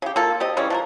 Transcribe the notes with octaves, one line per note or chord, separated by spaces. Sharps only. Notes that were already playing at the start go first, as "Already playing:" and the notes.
C#3 G4
A#3 F4 A4
C4 G4 D#5
C#3 E3 G3 C#4
F3 D4 A#4